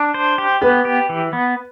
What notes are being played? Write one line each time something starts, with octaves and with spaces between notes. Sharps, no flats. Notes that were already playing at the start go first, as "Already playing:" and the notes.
Already playing: D4
C5
G4
B3 B4
G4
E3
B3